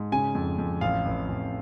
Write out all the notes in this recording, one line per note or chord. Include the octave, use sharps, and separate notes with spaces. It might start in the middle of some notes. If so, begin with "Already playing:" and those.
Already playing: G#2
C#3 G#5
F2
F2
A1 F5
A1
A1